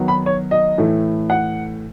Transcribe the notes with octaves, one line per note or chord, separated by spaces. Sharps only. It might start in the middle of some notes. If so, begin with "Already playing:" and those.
Already playing: D#3 F#3 B3
B5
C#5
D#5
A2 E3 A3
F#5